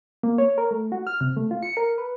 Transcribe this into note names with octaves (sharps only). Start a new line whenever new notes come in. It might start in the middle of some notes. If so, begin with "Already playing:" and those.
A#3
C#5
A#4
A3
F#4
F6
C3
A3
F4
C#7
A#4
B4